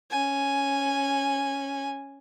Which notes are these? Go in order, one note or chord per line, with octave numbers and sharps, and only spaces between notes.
C#4 G#5